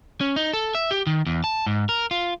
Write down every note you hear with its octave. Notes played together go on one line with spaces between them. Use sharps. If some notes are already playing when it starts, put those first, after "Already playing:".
C#4
D#4
A4
E5
G4
D#3
E2
A5
G#2
A#4
F4